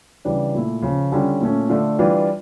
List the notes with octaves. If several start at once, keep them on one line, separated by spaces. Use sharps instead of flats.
C#3 E3 G3 D4
A#2 A3 E4
C#3 F3 C#4
D3 G3 C#4 F4
A#2 A3 C#4
D3 A3 D4 F4
E3 G3 D4 F4